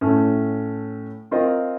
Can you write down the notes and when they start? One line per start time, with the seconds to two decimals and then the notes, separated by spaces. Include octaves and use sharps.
0.01 A2 A3 C#4
1.31 C4 F4 A#4 D#5